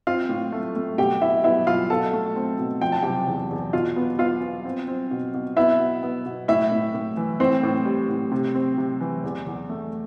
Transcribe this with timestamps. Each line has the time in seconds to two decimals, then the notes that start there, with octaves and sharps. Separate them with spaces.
0.07 C4 F4 F5
0.29 A2
0.52 A3
0.76 A3
0.98 B2 G4 G5
1.21 B2 E4 E5
1.44 B3 E4 E5
1.67 B2 F4 F5
1.90 B2 A4 A5
2.13 A3
2.36 C4
2.59 B2
2.81 F3 G5
2.92 A5
3.03 C3 G4 G5
3.27 E2
3.51 E2
3.73 B2 F4 F5
3.96 B3
4.19 B3 F4 F5
4.42 B3
4.65 C4
4.88 C4
5.11 B2
5.34 B2
5.56 B3 E4 E5
5.79 B2
6.03 B3
6.26 B2
6.48 A2 E4 E5
6.72 A2
6.94 A2
7.17 E3
7.40 A2 C4 C5
7.63 A2
7.86 G3
8.09 A2
8.32 C3
8.55 C4
8.78 C3
9.01 E3
9.24 E2
9.46 E2
9.69 A3